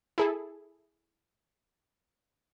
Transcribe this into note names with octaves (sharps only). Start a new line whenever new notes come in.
E4 G#4 A4